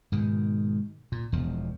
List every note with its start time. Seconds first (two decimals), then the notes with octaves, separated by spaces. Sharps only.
0.12 G#2 B2 D#3
1.12 A#2
1.32 E1 E2 F3